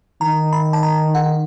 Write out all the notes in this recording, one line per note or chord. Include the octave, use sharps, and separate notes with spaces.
D#3 A#5
B5
A5
A#5
F#5